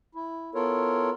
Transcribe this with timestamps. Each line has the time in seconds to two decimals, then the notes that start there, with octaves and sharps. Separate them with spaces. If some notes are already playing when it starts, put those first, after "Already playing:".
0.15 E4
0.55 B3 E4 F4 A4 A#4 C#5